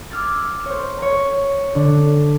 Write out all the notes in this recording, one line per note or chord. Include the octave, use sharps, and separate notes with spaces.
D6 E6 F6 G#6 A6
C5 C#5
C#5 A#5
D3 D4